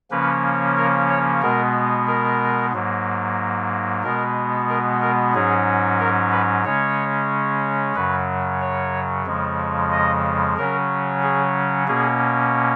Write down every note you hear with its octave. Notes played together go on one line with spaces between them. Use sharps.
C#3 F3 A#3 C#4 B4
A#4
C#5
B2 G#3 B3 A#4
A#4
G#2 F#3 A#3
B2 G#3 B3 A#4
A#4
A#4
G#2 F#3 C#4 G#4
A#4
B4
C#3 G#3 C#4 C#5
F#2 C#3 F#3 B4
C#5
F2 C#3 F3 G#3
D#5
C#3 F#3 C#4 A#4
G#4
B2 A#3 C#4 G#4